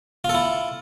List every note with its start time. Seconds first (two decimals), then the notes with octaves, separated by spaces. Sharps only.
0.24 F4
0.29 A4
0.34 E4